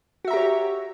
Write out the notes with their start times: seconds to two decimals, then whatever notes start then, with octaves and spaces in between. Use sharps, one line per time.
0.25 F#4
0.28 E5
0.31 A#5
0.34 G4
0.37 C#5